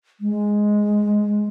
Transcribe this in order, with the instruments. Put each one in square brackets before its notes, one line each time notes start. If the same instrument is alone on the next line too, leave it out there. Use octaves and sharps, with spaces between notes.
[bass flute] G#3